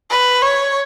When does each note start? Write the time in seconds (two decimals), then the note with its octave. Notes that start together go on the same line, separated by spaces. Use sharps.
0.10 B4
0.42 C#5